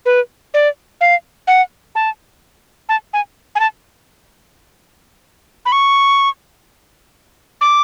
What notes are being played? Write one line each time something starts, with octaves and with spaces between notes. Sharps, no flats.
B4
D5
F5
F#5
A5
A5
G#5
G#5
A5
B5
C#6
D6